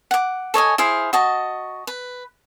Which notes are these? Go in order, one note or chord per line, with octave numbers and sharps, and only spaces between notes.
F#5 D6
A4 C#5 D#5 G#5
E4 G#4 C5 F5
F#4 D#5 A5
B4